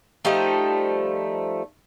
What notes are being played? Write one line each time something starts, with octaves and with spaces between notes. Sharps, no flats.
F3 G3 A3 D#4